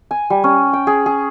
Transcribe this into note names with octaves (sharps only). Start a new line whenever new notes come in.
G#5
G3
C#4
G5
G#4
G#4